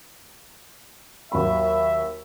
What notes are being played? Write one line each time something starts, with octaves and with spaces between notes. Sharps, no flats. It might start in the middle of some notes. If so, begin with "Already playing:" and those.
D#2 F#3 E5 B5